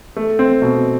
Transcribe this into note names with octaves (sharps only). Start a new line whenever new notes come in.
A3
C4
B2